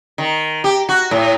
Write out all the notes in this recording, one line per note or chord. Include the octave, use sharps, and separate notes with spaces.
D#3
G4
F#4
A2